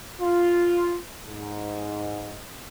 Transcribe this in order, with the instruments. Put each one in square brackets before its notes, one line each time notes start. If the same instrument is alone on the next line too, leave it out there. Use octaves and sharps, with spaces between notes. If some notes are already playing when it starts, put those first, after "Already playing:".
[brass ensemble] F4
G#2